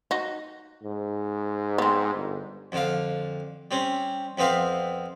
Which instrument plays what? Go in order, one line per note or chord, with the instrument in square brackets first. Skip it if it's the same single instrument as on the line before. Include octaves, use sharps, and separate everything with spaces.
[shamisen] D#4 F#4
[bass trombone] G#2
[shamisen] B3 C4
[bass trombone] G1
[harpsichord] F2 D3 F5
G3 C4 C#4
F2 B3 C4 E5 F5